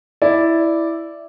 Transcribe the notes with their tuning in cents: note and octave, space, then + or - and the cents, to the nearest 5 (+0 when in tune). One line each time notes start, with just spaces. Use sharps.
E4 +0 D5 +0